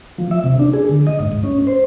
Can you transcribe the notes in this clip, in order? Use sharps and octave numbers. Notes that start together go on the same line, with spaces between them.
F3
E5
C3
D4
G#4
D3
D#5
G#2
G#2
C#4
C5